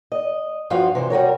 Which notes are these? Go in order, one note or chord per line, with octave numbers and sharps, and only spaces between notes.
D#5
G2 F3 F4 F#4 F5
C3 E3 C5
G3 F#4 A#4 C#5